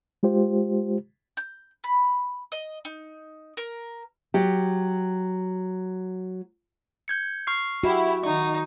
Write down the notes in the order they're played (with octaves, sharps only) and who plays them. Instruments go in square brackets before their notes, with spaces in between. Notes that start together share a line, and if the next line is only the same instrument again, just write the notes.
[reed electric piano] G#3 F4 G4 C5
[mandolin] G6
B5
D#5
D#4
A#4
[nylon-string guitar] F#3 G4
[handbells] G6 G#6 C#7
C#6 F6 C7
[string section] E4 G4 [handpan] F#4
[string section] D#3 [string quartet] D#4 [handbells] C#6